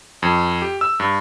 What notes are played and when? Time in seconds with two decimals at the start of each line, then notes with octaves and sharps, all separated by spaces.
0.22 F2
0.62 G4
0.81 E6
1.00 G2